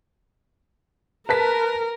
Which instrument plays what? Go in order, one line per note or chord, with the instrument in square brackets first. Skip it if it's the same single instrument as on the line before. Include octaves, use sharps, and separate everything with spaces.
[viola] A#4 [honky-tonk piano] B4 A5 B6